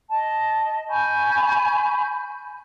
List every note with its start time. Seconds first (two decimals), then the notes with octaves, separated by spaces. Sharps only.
0.09 D#5 A5
0.89 G#5 B5 C#6 G6